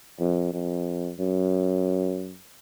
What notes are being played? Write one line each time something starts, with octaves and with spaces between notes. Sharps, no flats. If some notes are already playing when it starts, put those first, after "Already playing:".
F2
F2
F#2